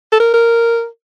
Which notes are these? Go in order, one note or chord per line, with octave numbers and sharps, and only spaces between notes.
A4
A#4
A#4